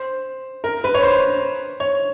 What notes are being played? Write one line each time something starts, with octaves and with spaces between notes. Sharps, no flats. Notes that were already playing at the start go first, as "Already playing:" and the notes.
Already playing: C5
A#4
B4
C#5
C5
C#5